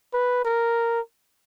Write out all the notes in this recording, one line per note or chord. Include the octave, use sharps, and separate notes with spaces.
B4
A#4